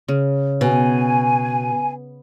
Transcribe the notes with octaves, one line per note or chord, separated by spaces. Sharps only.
C#3
B2 G#5